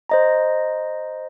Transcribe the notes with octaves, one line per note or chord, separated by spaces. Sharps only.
C5 D#5 A#5